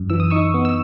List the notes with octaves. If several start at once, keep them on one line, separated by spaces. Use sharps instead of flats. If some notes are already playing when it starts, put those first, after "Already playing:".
Already playing: F#2
E3 E6
D#6
D#4 C#6 E6
B3
E6